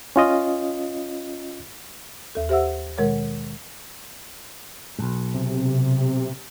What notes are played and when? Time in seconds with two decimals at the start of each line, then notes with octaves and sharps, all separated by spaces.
0.16 C#4 F4 D#5
2.35 D#2 A4
2.49 G4 C5 E5 F#5 E6
2.98 B2 D#3 G#3 A#4 C#5
4.99 B1 G#2
5.34 C3